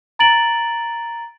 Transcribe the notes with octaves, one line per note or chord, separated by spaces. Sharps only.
A#5 A6 D7 F#7